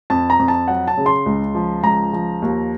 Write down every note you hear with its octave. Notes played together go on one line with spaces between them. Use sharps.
F2 A5
A#5
F2
A5
F#3 F#5
A5
C#3
C6
C#2
F3
C#2 A#5
F3
D#2